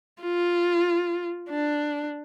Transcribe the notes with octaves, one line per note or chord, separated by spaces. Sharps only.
F4
D4